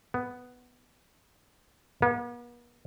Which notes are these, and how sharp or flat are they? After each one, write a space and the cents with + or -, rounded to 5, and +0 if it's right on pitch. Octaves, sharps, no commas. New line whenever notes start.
B3 +5
B3 -45